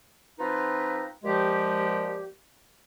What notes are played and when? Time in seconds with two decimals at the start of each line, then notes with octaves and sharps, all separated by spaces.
0.39 F3 C4 D#4 F4 B4
1.24 A#2 F3 G#3 G4